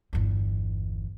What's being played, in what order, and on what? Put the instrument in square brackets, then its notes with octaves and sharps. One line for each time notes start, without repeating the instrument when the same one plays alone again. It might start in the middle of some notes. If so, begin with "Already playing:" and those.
[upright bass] G1 E2